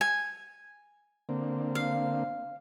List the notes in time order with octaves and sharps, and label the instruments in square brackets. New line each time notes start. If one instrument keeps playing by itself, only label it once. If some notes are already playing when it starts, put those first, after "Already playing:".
[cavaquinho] G#5
[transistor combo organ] D3 A#3 C4
[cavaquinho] F5